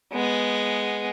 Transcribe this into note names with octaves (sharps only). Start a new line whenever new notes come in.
G#3 B3